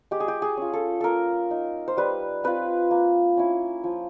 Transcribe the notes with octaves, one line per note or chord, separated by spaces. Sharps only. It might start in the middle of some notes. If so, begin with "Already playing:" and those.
G#3 G4
G#4
G4
G#4
C#4 F4
A4
A#3 A4 A#4
D#4
C5
G3 B4
C4 F4 B4
A#3
C#4 E4
F3